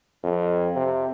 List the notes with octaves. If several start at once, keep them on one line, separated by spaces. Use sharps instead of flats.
F2
C3